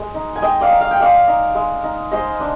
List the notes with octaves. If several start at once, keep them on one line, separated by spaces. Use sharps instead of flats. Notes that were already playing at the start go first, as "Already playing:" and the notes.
Already playing: G#3
D#4
G#5
G#3 D#5 G5
D5 F5
D#4
F5
G5
G#3 D5 F5
D#4
G#3
D#4
G#3 C5 D#5
D4